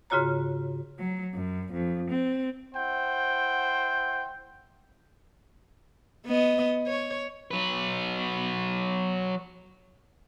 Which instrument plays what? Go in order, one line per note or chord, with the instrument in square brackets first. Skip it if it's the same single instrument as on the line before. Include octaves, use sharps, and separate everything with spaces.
[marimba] G#2 C#3 F4 F#4 C#5 A#5
[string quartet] F#3
F#2
F2
C4
[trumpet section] E4 C5 F#5 G5
[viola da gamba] B3 D#5
C#5
[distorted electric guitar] F#3 B4